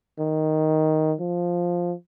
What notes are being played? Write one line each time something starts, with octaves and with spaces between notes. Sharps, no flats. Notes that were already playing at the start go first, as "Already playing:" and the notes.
D#3
F3